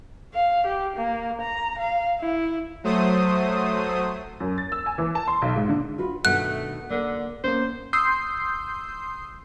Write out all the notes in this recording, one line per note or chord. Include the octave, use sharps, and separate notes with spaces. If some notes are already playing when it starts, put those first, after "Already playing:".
F5
G4
A#3
A#5
F5
E4
F#3 A3 C5 D#6
F#2
A6
E6
G#5
E3
A5
C6
B1
G#2
D3
F4 F#4 B4
G2 B2 D#3 A3 F#5 F#6
D3 A#3
A#3 B3 C#4 C5
C6 D#6 E6 G6 C7